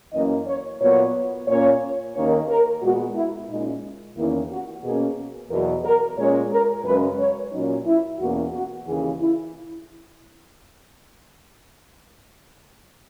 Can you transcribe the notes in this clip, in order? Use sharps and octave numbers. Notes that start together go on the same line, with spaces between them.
F#2 E3 A#3 C#4 D#5
C#5
A#2 F#3 B3 C#5
A#2 A#3 C#4 C#5
D#2 D#3 A#3 C#4 C#5
A#4
A#2 G#3 B3 F#4
E4
A#2 G#3 C#4 D#4
E2 D#3 A#3 C#4 E4
F#4
B2 A#3 C#4 G#4
E2 B2 F#3 A#4
A#4
A#2 G#3 C#4 C#5
A#4
F#2 C#3 G#3 C#4 B4
C#5
A#2 F#3 C#4 D#4
E4
E2 B2 A#3 C#4 F#4
F#4
D#2 C#3 E3 G#4
E4